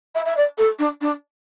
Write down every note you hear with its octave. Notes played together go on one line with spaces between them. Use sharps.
E5
E5
D5
A4
D4
D4